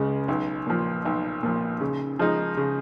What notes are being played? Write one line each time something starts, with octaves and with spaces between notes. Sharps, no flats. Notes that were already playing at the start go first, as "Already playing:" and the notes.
Already playing: C#2 C#3 G#3
B1
A#2 F3
B1
A#2 F3
C#3
F3 G#3 D#4
C#3